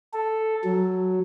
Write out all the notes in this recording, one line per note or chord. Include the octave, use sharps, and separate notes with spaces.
A4
F#3